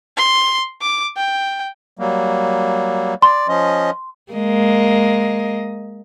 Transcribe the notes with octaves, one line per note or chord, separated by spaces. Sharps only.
C6
D6
G5
F#3 G3 A#3
D5 C6
F3 C#4 D#5
G#3 A#3 D#5